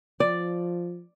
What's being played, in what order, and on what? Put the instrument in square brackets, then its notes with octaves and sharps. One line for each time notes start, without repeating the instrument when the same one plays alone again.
[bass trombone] F3 [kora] D5